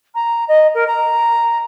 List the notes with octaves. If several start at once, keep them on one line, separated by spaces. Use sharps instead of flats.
A#5
D#5
A#4
A#5